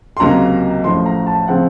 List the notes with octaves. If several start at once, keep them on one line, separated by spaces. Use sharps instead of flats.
C6
C#2 C3 F#3 A#3 A#5
A1 A2 F3 C6
A#5
A5
C#3 F3 C4 F#5